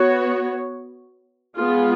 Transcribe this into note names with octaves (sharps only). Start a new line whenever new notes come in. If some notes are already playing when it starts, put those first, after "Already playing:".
Already playing: B3 F#4 C#5
G#3 B3 F4 G#4